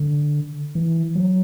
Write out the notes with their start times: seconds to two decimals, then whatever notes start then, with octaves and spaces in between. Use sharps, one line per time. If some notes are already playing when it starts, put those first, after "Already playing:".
Already playing: D3
0.75 E3
1.15 F#3